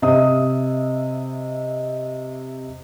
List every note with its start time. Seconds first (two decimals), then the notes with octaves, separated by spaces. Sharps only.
0.02 C3 D#5 E5 D#6